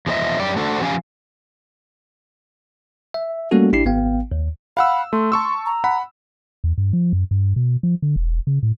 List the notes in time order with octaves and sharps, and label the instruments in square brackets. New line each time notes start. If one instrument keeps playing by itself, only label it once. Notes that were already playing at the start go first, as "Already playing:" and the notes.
[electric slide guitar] E2 F3 G#3 C4 D#5 E5
F#2 G4 D5
A3 D4 F#4 A4 C5
F3 C#4 G4 D#5 F5 G#5
[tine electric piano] E5
G3 A3 A#3 C#4 F#4 A4
A1 D4 E4 G4 C7
G#1 B3 F5 G5
D#2
[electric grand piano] F5 F#5 E6 [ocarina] B5
[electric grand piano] A3 [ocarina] C6
[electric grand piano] A5 C#6 E6
[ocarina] A#5
[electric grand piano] F#5 B5
[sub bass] E2
G2
F3
F#2
G2
B2
F3
D3
E1
C#3
A2